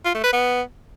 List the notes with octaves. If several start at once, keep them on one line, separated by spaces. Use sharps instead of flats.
F4
A3
B4
B3